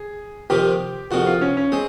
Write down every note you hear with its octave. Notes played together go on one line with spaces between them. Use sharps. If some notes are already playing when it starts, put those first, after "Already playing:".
Already playing: G#4
F2 C3 D#3 G4
F2 C3 D#3 F#4
F4
C#4
C#4
G#3 C4